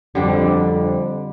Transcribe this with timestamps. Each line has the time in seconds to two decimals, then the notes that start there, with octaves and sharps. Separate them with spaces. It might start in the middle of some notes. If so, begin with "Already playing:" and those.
0.15 F2 D3 G3 D4